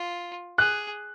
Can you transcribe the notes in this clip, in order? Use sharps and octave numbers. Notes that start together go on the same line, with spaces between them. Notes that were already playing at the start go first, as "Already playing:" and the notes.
Already playing: F4
G#4 F#6